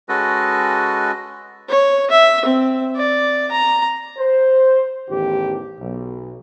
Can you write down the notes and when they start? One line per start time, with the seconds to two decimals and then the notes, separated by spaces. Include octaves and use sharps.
0.09 G#3 C#4 F#4 A4 B4 D#5
1.69 C#5
2.11 E5
2.45 C4
2.96 D5
3.51 A#5
4.17 C5
5.09 A1 E2 D#3 G4
5.78 B1